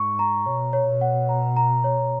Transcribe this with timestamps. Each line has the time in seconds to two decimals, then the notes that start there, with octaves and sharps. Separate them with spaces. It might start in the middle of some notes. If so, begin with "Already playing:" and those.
Already playing: G#2 C#6
0.19 A#5
0.46 B2 C#5
0.73 C#5
0.87 B2
1.01 F#5
1.29 A#5
1.56 A#5
1.84 C#5